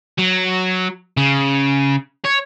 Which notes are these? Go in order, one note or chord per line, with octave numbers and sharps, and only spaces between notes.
F#3
C#3
C#5